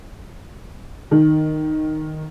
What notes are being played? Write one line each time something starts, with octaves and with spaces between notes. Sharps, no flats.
D#3